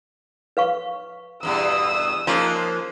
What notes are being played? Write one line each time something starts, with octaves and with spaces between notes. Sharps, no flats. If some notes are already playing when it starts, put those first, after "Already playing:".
B4 F5 C#6
E2 G2 B2 D#6 E6
F3 G#3 A#3 C#4 D#4